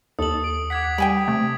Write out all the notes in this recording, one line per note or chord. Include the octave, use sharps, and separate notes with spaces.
D#2 A4 D#6 F#7
D7
F#5 D6 G#6 B6
G3 G5 G#5 B5 D7
C3 A3